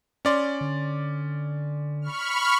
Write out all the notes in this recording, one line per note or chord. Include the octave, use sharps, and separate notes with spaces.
C#4 D5 C6
D3
B5 C#6 F6